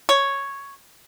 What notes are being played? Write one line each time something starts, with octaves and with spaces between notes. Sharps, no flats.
C#5